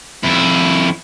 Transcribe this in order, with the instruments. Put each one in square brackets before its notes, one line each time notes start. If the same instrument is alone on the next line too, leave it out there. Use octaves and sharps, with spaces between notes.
[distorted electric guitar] F2 E4